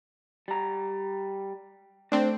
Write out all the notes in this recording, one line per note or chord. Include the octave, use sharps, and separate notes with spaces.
G3 A#5
A3 C4 D4